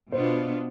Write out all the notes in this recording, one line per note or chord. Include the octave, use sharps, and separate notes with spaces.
B2 B3 D4 F4 C5